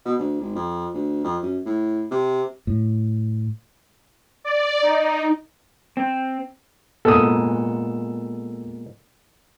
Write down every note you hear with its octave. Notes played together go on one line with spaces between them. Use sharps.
B2
D2
G#1
F2
D2
F2
F#2
A2
C3
A2
D5
D#4
C4
A#2 G#3 B3 A4 D#6